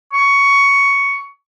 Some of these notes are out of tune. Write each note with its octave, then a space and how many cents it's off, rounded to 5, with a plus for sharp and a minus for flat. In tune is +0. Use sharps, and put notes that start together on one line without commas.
C#6 +10